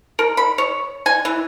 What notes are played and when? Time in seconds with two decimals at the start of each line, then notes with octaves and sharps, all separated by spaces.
0.19 A#4
0.37 B5
0.58 C#5
1.06 G#5
1.25 E3